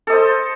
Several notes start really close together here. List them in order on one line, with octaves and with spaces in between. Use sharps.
A4 D#5 C5